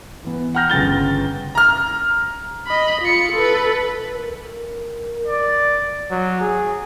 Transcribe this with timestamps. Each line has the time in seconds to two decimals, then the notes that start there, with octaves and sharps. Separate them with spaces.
0.25 E3 B3
0.55 F#5 G5 A#5 F6 G6 A#6
0.70 G1 C#3 G5 A6 G7
1.55 A#5 F6
2.67 D#5 B5
3.02 F4 C#7
3.32 A4 B4
4.15 A#4
5.27 D5
6.10 F#3
6.41 G#4